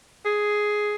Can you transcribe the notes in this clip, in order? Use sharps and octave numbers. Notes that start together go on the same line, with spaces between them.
G#4